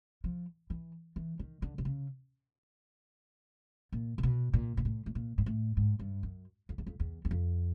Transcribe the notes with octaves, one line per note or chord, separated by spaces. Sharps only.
F3
E3
E3
D#3
D3
C3
C#3
A#2
C3
B2
A#2
A#2
A2
A2
A#2
G#2
A2
G#2
G2
F#2
F2
E2
F2
E2
E2
F2